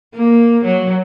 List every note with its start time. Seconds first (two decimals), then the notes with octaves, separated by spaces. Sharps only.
0.14 A#3
0.65 F#3